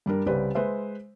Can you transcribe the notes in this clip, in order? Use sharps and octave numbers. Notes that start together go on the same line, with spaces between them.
G2 G3 D4 A#4
C2 C#3 G4 B4 C5 D5
G#3 B4 C5 E5